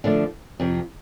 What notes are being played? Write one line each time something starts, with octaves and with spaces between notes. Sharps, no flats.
D3 F3 A3 D4
F2 C3 F3